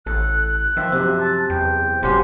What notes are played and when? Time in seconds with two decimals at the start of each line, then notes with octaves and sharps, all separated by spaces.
0.06 A1 A4 F#6
0.77 D#3 F3 E5
0.92 F#2 C3
1.21 A5
1.50 E2 G5
2.03 F1 C3 F#3 C#4 G4 C6